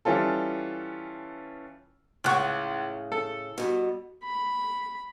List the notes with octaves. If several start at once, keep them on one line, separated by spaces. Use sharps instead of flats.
E3 G3 C#4 F4 A4
C#2 A2 C#3 F#5 C#6
A4
G2 B2
B5